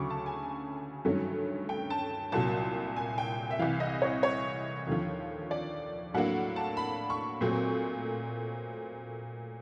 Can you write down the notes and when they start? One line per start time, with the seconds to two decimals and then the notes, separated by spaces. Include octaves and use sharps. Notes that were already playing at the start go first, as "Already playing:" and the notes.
Already playing: D2 C#3 F#3 C#6 D6
0.10 A5
0.26 G#5
1.05 G2 D#3 F#3 A3 C#4
1.69 G5
1.90 A5
2.32 C2 A#2 F#3 A5
2.96 G#5
3.18 G5
3.51 E5
3.59 C2 C3 E3 F5
3.80 D#5
4.02 C#5
4.23 C#5
4.87 D#2 D3 F3
5.51 D5
6.14 A2 F#3 A#3 D4 F#5
6.56 A5
6.77 B5
7.10 C#6
7.41 A#2 F#3 A3 C4